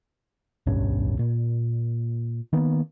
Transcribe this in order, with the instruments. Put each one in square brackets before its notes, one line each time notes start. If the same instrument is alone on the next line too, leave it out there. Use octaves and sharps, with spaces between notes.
[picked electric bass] D1 B1 G2 C#4
A#2
D#3 A#3 B3